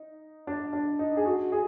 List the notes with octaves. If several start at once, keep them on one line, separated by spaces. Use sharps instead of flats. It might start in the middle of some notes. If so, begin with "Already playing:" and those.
Already playing: D#4
D4
D4
D#4
G#4
F#4
G#4